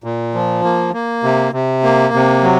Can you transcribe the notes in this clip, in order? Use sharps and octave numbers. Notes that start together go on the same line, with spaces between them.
A#2
F3
A#3
A#3
C3
C3
A#3
C3
F#3